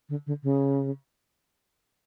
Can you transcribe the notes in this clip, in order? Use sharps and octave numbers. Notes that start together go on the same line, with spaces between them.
D3
D3
C#3